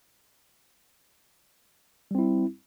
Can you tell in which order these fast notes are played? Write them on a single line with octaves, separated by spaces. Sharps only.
G3 C4 E4